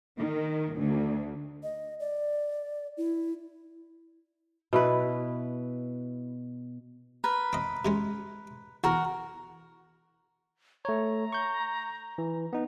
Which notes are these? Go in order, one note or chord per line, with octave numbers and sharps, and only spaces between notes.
D#3
D2
D#5
D5
E4
B2 E4 B4
A#4 B4
C4 D#5
C3 G#3 C#4
E2 F#4 A#4
A3 C#5 A#5
C#6 G6
E3
B3 D#4